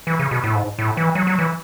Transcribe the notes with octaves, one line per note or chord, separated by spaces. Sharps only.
E3
C#3
B2
A2
G#2
A2
E3
F#3
F#3
E3